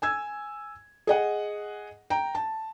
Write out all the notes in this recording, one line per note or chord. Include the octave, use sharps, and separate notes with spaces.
G#5 E6 G#6
G#4 D#5 F#5
G5 A#5
A5